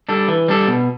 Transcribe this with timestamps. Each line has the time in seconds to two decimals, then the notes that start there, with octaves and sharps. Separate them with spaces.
0.09 G3 D4 A4
0.28 E3
0.48 G3 D4 A4
0.68 B2